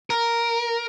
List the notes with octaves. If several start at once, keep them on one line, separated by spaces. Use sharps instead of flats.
A#4